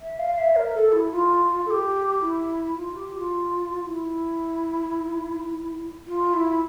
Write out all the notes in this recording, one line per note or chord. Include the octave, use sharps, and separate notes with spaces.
E5
F5
E5
A#4
A4
E4
F4
A4
G4
E4
F4
G4
G4
F4
E4
F4
E4